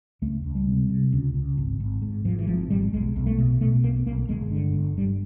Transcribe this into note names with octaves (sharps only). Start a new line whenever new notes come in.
C#2 A3
C#2
G3
C3
C3
C#2
C#2
G#1
G#1
G#2
G#2 F3
E3
G#1 F3
G#1 G3
B1 G#3
B1
A3
B2
B2 A3
B1 A#3
B1 A#3
G1 G#3
D3
G1
G2 G3